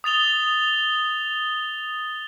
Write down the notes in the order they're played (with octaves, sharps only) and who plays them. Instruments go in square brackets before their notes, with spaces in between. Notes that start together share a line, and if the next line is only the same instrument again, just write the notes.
[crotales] D#6 A6 F7 G7